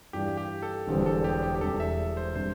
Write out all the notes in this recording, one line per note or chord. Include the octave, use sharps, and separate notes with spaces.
G2 E3 G3 D4 F4 G4
G4
A4
E1 E2 D3 G3 C4
A4
G4
G4
G4
E1 E2 C3 G3 D4 A4
E5
C5
C3 G3 D4 C5